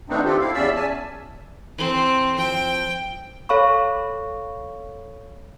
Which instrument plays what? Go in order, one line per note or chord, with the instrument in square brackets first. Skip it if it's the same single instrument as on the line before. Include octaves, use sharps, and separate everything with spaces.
[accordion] D#3 A3 B3 C4 D4 D#4
C4 F4 G4 A4
E4 F5
E2 C#4 D5 E5 E6
G#5 A5
[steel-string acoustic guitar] E3 A4 [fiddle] C4
[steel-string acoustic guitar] F3 C4 [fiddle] G5
[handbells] A4 C#5 F5 B5 C#6